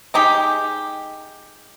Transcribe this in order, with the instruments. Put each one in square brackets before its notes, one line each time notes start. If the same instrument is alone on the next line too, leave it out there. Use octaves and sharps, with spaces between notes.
[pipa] G#3 D#4 G4